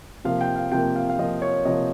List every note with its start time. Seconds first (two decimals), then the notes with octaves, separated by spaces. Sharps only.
0.25 C3 F3 A#3 F5
0.41 G5
0.56 F5
0.72 C3 F3 A#3 G5
0.96 F5
1.10 F5
1.19 C3 F3 A#3 D#5
1.42 C#5
1.65 C3 F3 A#3 D#5